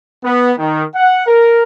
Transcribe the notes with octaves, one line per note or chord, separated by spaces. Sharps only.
B3
D#3
F#5
A#4